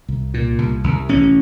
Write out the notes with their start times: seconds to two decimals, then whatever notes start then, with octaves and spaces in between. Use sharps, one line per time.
0.09 C2
0.34 A#2
0.59 C2
0.84 C2
1.09 A1 C#4